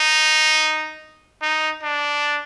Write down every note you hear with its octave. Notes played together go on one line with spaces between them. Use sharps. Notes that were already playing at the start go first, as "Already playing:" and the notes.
Already playing: D#4
D#4
D4